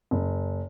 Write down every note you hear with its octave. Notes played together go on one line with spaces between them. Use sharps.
F#1